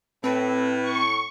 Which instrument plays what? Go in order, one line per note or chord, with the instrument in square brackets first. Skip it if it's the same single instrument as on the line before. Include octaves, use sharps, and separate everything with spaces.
[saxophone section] A2 [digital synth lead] C4 [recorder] B4
[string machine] C#6